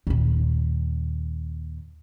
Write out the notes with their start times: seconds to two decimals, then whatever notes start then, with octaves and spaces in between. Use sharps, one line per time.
0.07 D#2 A#2